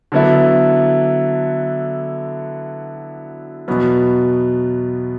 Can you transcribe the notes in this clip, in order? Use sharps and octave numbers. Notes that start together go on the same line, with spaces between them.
D3 F#3 B3 E4 A4
E2 B2 F#3 B3